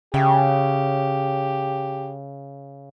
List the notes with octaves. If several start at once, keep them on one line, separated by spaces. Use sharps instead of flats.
C#3 G4 C#5 E5 G5